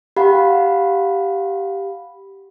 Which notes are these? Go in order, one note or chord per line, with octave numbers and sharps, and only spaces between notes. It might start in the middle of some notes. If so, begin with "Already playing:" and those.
G4 F5 F#5 B5